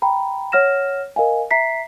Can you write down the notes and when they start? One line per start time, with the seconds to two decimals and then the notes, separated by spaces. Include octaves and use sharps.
0.02 G5 A#5 B5
0.52 C#5 F#5 F6 A#6 E7
1.16 A#4 D#5 F5 G#5
1.51 E5 A#5 B6 C7